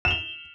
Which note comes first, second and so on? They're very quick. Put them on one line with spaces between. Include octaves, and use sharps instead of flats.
E7 F7 G7